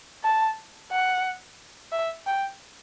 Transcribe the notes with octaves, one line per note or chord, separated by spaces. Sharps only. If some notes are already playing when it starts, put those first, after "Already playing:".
A5
F#5
E5
G5